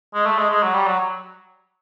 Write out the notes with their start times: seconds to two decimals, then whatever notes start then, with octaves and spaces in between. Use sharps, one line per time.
0.14 G#3
0.26 A3
0.38 G#3
0.51 G#3
0.63 F#3
0.75 G3
0.87 F#3